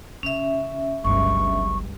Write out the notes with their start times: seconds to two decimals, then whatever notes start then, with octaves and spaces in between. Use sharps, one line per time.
0.23 C#3 C#4 E5
1.04 G1 C#2 G2 F#3 C#6